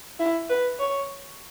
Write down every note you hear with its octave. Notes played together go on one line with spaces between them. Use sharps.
E4
B4
C#5